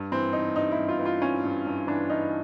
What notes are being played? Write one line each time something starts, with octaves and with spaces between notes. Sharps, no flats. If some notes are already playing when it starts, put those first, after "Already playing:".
Already playing: G2
E3 C4
E3 D#4
G2 D#4
E4
G2
F4
E3
F4
E3 C#4
G2
G2
E3 D4
E3 D#4